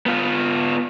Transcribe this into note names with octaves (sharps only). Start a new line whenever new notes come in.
B3 F4